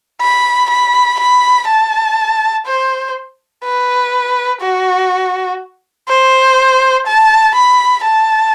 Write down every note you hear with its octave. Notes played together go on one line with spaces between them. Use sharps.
B5
B5
B5
A5
C5
B4
F#4
C5
A5
B5
A5